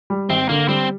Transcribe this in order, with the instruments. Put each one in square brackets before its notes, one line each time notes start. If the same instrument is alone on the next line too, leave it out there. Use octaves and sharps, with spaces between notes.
[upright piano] G3
[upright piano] G#1 [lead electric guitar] C4
[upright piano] D3 [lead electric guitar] A#3
[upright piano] G3 [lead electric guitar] C4